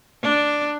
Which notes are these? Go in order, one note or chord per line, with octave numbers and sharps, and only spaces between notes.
D4